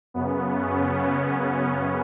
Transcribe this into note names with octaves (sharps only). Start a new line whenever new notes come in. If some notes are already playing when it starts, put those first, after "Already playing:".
F#2 C#3 B3
C#4